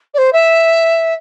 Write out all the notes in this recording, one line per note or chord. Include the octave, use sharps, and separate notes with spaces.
D5
C5
E5